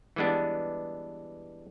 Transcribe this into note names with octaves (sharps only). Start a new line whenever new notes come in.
E3 G3 G#3 B3 D4